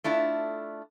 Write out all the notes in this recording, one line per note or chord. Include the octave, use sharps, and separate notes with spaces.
A3 D4 E4 F4